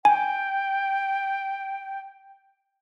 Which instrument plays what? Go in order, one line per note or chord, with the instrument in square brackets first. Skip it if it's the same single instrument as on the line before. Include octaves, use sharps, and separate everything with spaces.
[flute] G5 [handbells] G#5